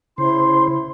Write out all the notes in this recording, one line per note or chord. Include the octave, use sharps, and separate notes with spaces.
C#3 E4 C5 C6